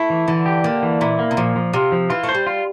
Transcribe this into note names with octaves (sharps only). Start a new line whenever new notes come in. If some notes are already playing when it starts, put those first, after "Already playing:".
Already playing: A3 E4
E3
D3 E3
G4
D3 A#3
E3
A#2 E4
A#3
C3
A#2 F3
F3
C3 F4
F3
E3 F4
A3
C5
G3
F4